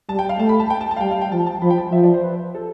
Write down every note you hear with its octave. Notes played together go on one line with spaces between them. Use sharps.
G3 A5
G5
F5
A3 A5
B5
A5
G5
A5
A5
F5
G3 G5
F5
G5
F3 A5
A5
F3 B5
G5
A5
F3 E5
D5
C5
B4
A4